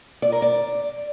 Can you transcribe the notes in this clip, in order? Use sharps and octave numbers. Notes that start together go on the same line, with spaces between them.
D5
A#4
D5